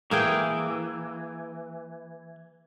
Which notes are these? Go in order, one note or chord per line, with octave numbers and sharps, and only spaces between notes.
E3 A#3 G#4 G5